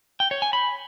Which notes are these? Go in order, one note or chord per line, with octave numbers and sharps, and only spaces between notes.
G5
C#5
G#5
B5